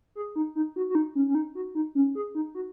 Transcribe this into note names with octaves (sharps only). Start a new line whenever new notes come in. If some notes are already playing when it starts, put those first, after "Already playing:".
G#4
D#4
D#4
F#4
F#4
D#4
C#4
C#4
D#4
F#4
D#4
C#4
G#4
D#4
F#4